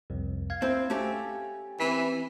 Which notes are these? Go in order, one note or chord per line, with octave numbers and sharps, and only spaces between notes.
C2 F2
F5 G#6
C4 E4
A3 C#4 G4
E3 C4 B6